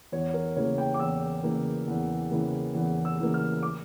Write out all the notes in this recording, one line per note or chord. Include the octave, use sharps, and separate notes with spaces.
E2 C#5
A#4
C#3 E3 A#3 C#5
G5
D6
E2 E6
C#3 E3 A#3
E2
C#3 E3 A#3
E2
E6
C#3 E3 A#3
F6
D6